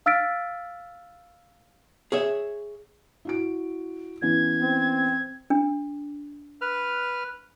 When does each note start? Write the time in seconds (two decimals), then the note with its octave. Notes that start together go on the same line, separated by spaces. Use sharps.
0.06 F5 E6 F6 A6 B6 D7
2.12 G#4 C#5 E5
3.25 E4 F#4 D7
4.22 E3 B3 C#4 G#6
4.59 C4
5.50 D4
6.61 B4 F6